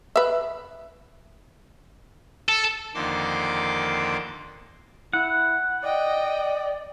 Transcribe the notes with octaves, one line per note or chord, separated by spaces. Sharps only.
B4 E5
A4
F2 D3 D#3 A#3 C6 D6
E4 F#5
D5 D#5 G5